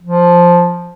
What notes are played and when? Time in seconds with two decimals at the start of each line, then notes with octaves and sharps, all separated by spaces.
0.03 F3